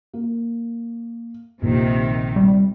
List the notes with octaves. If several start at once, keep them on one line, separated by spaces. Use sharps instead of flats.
A#3
A#1 D#2 C3 D#3
G3